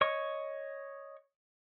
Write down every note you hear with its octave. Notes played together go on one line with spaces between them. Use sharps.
C#5 D#5 C#6